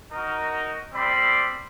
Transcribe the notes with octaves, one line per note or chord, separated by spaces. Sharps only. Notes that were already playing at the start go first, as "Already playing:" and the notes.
D#4 F#4 A#4
G3 C4 D5 B5 C6